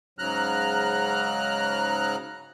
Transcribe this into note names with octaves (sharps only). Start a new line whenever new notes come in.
G#2 C#3 F#3 A#5 F6 F#6